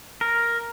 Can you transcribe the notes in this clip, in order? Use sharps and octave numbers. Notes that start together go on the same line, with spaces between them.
A#4